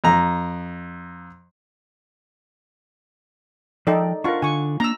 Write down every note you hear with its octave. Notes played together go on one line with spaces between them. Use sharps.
F2 A#5
F3 D#4 A4 D5 G5
D4 F4 A#4 F#5 C#6
D3 G#5 C#6
A#3 D4 A#5 E6